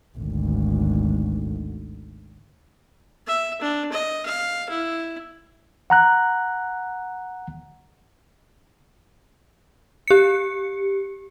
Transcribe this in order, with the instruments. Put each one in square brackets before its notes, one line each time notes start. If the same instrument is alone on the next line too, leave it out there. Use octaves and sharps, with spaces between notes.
[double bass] G#1 D2
[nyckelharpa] E5
D4
D#5
F5
E4
[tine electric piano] F#5 A#5 F#6
[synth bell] G4 C#7